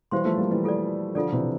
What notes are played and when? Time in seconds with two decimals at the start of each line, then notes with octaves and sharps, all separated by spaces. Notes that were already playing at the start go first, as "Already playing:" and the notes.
0.11 E3 G3 G4 C5 F5 C6
0.25 F3 A3
0.38 G3 A#3
0.51 E3 G3
0.64 F4 A4 D5
1.15 D3 F3 F4 A4 D5
1.32 C3 E3